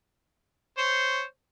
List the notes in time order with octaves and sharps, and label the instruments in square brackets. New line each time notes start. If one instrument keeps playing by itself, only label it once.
[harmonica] C5 C#5